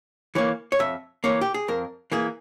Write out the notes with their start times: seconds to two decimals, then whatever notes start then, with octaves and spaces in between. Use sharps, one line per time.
0.35 E3 A#3 C#5
0.72 C#5
0.79 F2 E5
1.24 E3 A#3 C#5
1.41 G4
1.54 G#4
1.68 F2 A#4
2.12 E3 A#3 G#4